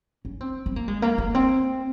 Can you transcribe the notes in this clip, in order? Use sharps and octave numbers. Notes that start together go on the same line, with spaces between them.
C#4
C4
C4
A#3
G#3
A#3
A#3
C4